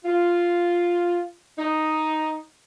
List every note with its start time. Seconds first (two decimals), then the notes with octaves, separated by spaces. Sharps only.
0.04 F4
1.58 D#4